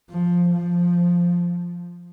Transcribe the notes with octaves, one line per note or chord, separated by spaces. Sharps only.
F3
F3